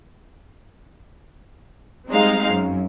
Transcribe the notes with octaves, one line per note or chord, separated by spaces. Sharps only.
G3 G#3 C4 D#4 F5
F#2